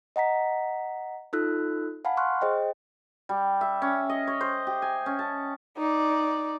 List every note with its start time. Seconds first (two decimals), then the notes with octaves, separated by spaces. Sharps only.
0.16 D#5 F#5 A#5 B6
1.33 D#4 F4 A4 E6 F#6
2.05 F5 F#5 G#5 A5 B5
2.17 C6 C#6 F6 F#6
2.41 G#4 C5 D#5 G5
3.29 G3
3.61 E5
3.82 C#4
4.09 D#5
4.27 C#5
4.41 C5
4.67 G4
4.82 G#5
5.06 C#4
5.19 A5
5.78 D#4 D5